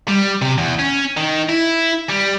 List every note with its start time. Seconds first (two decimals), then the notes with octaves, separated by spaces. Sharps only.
0.09 G3
0.42 C3
0.58 E2
0.79 C#4
1.17 D#3
1.49 E4
2.10 G3